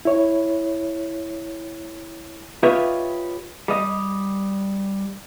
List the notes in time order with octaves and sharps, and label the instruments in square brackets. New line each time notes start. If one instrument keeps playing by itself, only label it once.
[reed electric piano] E4 C#5
[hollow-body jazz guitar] F4 G4 B4 C#5 D#5 E5
G3 D#5